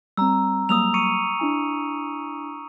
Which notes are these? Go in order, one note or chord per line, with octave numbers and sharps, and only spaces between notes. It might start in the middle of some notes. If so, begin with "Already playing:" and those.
G3 C4 A#5 E6
F#3 G3 A#3 D#6 E6 F7
C#6 C#7 D#7
D4 E4 G#5